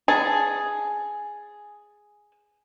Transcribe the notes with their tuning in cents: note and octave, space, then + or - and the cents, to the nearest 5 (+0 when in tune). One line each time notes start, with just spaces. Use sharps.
G#4 +0 A5 +0